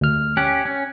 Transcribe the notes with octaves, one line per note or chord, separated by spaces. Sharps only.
D2 F6
C#4 G4 F#6
C#4